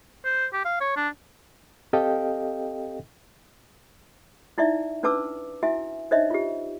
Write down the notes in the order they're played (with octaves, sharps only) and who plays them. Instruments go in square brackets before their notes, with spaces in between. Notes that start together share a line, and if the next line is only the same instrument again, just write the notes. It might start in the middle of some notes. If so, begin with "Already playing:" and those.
[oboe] C5
G4
F5
C#5
D4
[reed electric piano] C4 G4 A4 D#5 F5 G5
[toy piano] D#4 E4 D5 E5
C#4 D4 B4 A5 D6 E6
E4 F#4 E5 G#5
D4 D#4 C5 C#5 D#5 E5
F4 G4